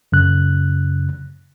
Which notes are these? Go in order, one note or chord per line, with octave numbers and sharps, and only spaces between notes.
F#2 C#3 F#6